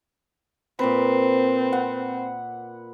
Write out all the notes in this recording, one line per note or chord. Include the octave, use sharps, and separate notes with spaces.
A#2 C4 A#4 B4
F#5